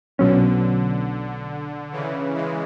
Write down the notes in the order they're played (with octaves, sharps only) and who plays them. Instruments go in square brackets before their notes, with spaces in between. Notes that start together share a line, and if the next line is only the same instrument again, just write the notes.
[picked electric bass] B1 B2 F#3 C#4 [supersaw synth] D3
[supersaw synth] C#3 E3
E3 G#3